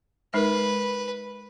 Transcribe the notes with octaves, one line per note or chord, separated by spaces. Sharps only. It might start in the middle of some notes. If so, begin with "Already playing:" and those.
G#3 D#4 A#4 B4